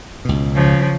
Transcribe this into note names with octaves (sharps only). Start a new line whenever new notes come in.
C#2 B2
C#3 F3